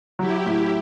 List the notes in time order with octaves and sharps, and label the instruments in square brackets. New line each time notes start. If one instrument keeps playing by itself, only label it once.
[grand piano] F#3 [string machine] E4 G4
[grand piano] A2